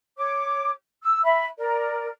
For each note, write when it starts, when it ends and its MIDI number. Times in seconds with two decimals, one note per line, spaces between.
0.17 0.70 73
0.17 0.70 86
1.02 1.22 88
1.24 1.45 76
1.24 1.45 83
1.58 2.07 70
1.58 2.07 74